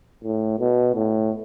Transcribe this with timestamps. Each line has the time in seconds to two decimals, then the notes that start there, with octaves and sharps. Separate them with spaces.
0.24 A2
0.59 B2
0.95 A2